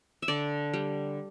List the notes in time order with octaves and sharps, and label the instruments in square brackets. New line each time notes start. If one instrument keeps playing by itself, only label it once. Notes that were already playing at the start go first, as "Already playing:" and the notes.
[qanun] E5
D3 D5
G3